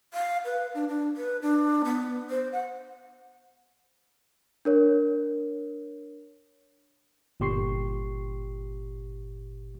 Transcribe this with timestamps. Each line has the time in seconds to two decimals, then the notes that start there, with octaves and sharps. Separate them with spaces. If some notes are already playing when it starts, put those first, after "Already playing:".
0.14 F5
0.45 B4
0.75 D4
0.88 D4
1.17 B4
1.42 D4
1.85 B3
2.30 C5
2.52 F#5
4.65 D4 A#4 C#5
7.40 G1 A#2 G4 C6 C#6 C7